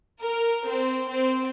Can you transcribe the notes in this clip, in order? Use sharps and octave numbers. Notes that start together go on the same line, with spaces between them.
A#4
C4
C4